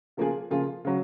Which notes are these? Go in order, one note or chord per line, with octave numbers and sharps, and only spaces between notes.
C#3 F3 A#3 F4 G#4
C#3 F3 A#3 F4 G#4
C#3 F#3